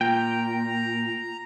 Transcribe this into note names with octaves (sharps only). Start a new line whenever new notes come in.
A#2 F4 G5 A#5